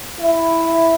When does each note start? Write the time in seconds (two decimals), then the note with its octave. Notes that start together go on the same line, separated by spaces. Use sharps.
0.20 E4